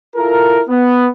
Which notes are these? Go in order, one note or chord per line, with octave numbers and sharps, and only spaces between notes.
E4 F4 A4 A#4
B3